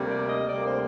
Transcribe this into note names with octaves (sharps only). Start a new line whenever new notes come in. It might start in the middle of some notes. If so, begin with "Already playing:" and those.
Already playing: D2 C3 G3 A#3
D5
D#5
D2 C3 G3 A#3 D5
C5